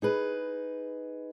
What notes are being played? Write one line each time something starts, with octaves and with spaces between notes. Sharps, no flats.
D#4 G#4 B4